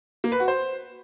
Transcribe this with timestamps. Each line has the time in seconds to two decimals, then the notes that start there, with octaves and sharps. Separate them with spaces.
0.24 A#3
0.32 B4
0.40 F#4
0.48 C5